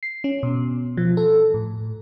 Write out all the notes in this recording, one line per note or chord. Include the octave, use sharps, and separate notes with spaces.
C7
C#4
B2
F3
A4
A2